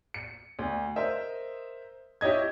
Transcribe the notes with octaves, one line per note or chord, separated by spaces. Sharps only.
C#7
D2
A#4 C5 D#5 E5
E4 G4 C#5 D#5 G#6